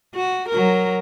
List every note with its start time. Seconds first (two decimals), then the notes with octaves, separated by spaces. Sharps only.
0.15 F#4
0.49 F#3 A#4